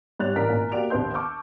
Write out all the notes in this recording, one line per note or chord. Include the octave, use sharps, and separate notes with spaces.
G#2 G3 C#5 F#6 A6 F7
A1 A#4 D5 A6 B6
G#1 A#2 A#4 G#5
A#3 F#4 G4 D5 D7 F7
A#1 D#2 C4 B4 C6 G6
A5 C#6 D6 E6 F6 G6